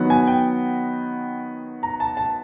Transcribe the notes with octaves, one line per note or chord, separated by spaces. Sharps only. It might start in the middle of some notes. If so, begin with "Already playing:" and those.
Already playing: D#3 F#3 B3 D#4
G#5
G5
A#5
A5
A5